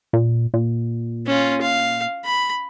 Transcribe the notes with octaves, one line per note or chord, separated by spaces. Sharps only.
A#2
A#2
C#4 F4
F5
B5